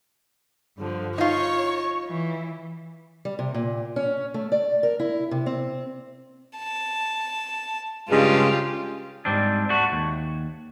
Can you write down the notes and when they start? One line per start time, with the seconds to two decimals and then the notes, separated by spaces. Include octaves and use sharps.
0.77 G2 D3 F3
1.18 D#4 F4 C#5 C#6
2.07 E3
3.25 G3
3.39 C3
3.54 A#2
3.96 C#4
4.34 A3
4.52 D5
4.83 A#4
5.00 E4
5.31 C3
5.46 C4
6.58 A5
8.09 G2 C#3 G#3 F4 G4
9.25 G#2 G3 C4 D4
9.70 A3 F#4
9.92 D#2